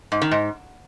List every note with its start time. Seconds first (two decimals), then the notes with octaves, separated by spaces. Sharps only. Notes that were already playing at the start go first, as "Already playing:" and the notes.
0.12 G#2
0.22 D#3
0.31 G#2